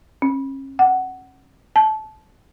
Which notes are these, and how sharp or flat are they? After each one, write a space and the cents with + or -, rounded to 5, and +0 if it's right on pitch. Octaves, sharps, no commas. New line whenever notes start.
C#4 -40
F#5 +10
A5 -20